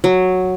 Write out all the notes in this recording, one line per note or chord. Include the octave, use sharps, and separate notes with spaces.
F#3